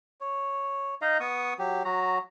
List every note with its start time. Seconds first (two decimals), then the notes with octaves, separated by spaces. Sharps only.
0.21 C#5
1.02 D#4 D#5 F5 A#5
1.20 B3 C#6 D#6
1.59 F#3 G4
1.85 F#3 F#4 A#5